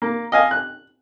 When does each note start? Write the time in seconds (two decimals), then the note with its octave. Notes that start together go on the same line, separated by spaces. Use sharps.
0.02 A#3
0.32 D#5 F5 G#5
0.51 F#6